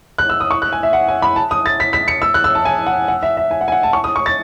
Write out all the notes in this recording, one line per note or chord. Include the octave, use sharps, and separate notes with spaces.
F#6
E6
D#6
C#6
F#6
G#5
E5
F#5
G#5
B5
A5
D#6
A6
B6
B6
C#7
E6
F#6
E6
A5
G#5
F#5
F#5
E5
E5
G#5
F#5
G#5
F#5
A5
C#6
D#6
C#6
A6